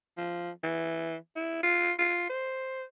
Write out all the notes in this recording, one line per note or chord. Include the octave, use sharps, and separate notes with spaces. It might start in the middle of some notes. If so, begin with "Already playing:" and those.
F3
E3
E4
F4
F4
C5